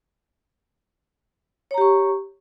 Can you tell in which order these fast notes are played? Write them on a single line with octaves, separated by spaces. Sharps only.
C#5 A#5 G4 C#6